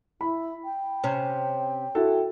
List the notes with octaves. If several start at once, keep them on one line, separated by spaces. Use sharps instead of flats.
E4 B5
G5
C3 C#4
E4 F#4 A4